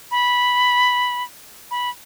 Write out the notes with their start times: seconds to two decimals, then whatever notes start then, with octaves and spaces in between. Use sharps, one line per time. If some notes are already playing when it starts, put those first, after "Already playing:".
0.11 B5
1.71 B5